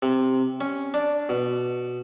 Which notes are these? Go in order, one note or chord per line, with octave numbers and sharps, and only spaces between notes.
C3
C#4
D4
B2